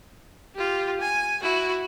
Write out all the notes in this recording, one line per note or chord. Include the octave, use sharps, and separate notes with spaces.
F4 G4
G#5
E4 F#4